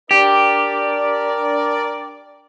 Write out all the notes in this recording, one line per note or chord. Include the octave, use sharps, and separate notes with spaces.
D4 G4 A#4 D5